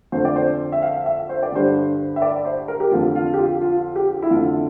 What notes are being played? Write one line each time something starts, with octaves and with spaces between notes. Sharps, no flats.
F2 D3 C5
D5
C5
E5
F5
E5
C5
D5
G2 D3 C5
E5
D5
C5
A#4
G4
F2 D3 F4
F4
G4
F4
F4
G4
E4
F2 F4
D3